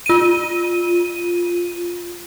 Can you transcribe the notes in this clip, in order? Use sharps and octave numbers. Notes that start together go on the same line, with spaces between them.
F4 D#7